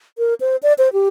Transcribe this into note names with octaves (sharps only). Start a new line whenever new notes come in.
A#4
C5
D5
C5
G4